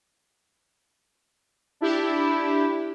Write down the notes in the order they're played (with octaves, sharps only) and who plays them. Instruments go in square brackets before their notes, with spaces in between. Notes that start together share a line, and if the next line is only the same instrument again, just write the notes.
[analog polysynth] D4 E4 G4